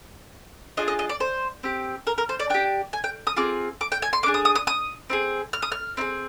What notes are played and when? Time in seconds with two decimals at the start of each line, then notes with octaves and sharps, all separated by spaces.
0.77 D4 F4 G#4 D#5
0.88 D#5
0.99 D#5
1.10 D5
1.20 C5
1.63 C4 G4
2.07 A#4
2.18 A#4
2.29 C5
2.40 D5
2.50 D4 G4 G5
2.93 G#5
3.04 G5
3.27 D#6
3.36 C4 F4 G#4 D6
3.81 D6
3.92 G5
4.02 G#5
4.13 C6
4.23 A#3 D6
4.26 D4 G#4
4.34 D#6
4.45 D#6
4.55 D#6
4.67 D#6
5.10 C4 D#4 G#4
5.53 F6
5.62 D#6
5.72 F6
5.97 C4 D#4
6.01 G#4